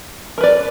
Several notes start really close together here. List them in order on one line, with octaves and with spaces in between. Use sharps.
A#4 B4 D5